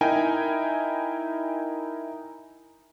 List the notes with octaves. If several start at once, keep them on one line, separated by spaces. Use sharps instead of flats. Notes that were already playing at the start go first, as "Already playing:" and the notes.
D#4 E4 A#4 G5 G#5